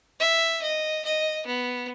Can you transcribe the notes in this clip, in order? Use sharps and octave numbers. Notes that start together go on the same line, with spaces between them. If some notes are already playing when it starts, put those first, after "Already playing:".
E5
D#5
D#5
B3